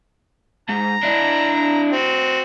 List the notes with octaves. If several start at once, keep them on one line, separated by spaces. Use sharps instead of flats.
G#2 A#5
D4 E4
C4 F#4